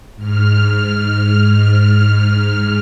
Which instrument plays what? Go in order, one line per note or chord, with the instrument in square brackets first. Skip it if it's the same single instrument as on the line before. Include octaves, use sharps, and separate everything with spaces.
[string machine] G#2 F6